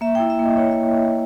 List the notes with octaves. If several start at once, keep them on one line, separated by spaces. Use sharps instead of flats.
A#3 E5
E4 G5
E5
A#3 D#5
E4 C#5
E5